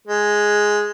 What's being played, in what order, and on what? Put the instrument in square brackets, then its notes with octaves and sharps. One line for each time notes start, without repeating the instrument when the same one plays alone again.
[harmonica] G#3